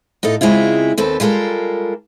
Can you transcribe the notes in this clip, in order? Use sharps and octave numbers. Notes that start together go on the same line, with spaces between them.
A2 D#4 F4 A4
C#3 G#3 C4 E4 F4
D#2 C4 A4 B4
G3 G#3 F4 A4 A#4